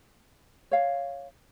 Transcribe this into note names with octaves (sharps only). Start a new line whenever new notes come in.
C#5 F5